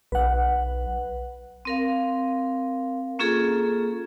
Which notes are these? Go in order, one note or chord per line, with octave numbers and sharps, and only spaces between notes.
B1 B4 F#5
C4 A#4 F5
A#3 C#4 F4 G#4 A4